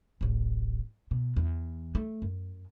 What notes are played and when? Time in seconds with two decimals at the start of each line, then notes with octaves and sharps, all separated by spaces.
0.21 D1 A1
1.11 B2
1.36 E2
1.95 A3
2.22 F#2